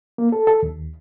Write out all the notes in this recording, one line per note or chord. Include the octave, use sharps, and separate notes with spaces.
A#3
A4
A4
D#2